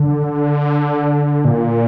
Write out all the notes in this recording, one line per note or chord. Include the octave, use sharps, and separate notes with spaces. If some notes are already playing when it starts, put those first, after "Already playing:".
Already playing: D3
A#2